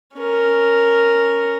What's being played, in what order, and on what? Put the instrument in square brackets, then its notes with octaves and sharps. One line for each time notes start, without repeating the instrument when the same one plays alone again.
[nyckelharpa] C#4 A#4